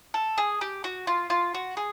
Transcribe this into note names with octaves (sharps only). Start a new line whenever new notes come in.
A4
G#4
G4
F#4
F4
F4
F#4
G#4